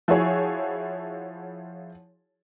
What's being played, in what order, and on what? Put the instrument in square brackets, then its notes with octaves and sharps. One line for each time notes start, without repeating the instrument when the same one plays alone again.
[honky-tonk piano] F3 E4 F#4 G#4 C#5